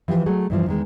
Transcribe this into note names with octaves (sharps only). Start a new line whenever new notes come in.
E3 F3 G4
F#3 A3 F#4 G#4
G2 E3 F3
E2 D#3 G#3